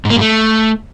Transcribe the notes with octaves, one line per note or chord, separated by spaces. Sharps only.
G#2
A#3
G2
A3